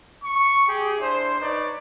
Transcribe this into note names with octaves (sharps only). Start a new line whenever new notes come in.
C#6
G4 G#4
D4 E4 C5
D#4 B4 C#5 D5